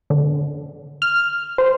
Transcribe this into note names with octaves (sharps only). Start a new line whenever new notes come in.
D3
F6
C5